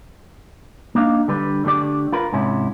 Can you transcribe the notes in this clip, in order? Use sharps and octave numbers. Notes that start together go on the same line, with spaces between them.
A#3 D4 D#4 F5
D3 G3 B4
D3 A3 G4 D5
F4 A#4 B4
G#2 C3 C#4 E4